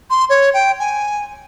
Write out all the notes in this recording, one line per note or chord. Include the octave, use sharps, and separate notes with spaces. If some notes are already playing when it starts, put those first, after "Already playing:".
C6
C#5
G5
G#5